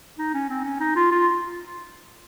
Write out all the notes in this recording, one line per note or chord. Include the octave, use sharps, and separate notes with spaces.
D#4
C#4
C4
C#4
D#4
F4
F4